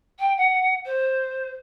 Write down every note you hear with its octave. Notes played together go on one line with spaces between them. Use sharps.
G5
F#5
C5